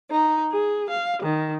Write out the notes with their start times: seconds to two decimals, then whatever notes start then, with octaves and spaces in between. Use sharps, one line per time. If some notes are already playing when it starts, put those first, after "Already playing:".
0.11 D#4
0.52 G#4
0.90 F5
1.22 D#3